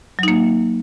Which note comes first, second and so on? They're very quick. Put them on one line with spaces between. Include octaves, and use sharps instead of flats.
F#3 D#4 A#3